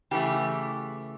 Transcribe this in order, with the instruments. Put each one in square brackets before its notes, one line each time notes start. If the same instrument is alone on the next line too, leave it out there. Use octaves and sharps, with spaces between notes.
[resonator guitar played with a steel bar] C#3 E3 A3 G4